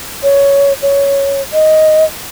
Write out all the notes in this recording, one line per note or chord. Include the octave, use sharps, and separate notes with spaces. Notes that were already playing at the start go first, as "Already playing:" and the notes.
C#5
C#5
D#5